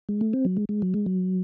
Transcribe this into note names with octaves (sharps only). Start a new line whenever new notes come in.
G#3
A3
C4
F#3
G#3
G#3
F#3
G#3
F#3